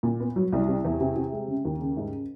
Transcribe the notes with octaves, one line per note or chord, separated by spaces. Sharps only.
A#2
B3
F#3
C2
C3
E2
C3
C3
G#3
C#3
D#2
C#3
G#2